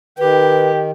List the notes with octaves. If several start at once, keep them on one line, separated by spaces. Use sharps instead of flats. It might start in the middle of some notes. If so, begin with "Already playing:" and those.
D#3 G4 B4